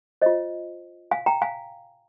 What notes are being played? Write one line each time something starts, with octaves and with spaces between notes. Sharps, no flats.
F4 C5 D#5
F5 G#5
G5 A#5
F5 G#5